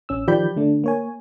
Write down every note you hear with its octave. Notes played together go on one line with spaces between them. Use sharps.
A1 C#4 E6
D#3 F3 G4 D5 B5 G6
D3 A3 D4
A#3 C#5 G#5